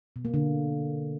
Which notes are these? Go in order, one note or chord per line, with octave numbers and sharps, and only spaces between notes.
B2
A#3
D3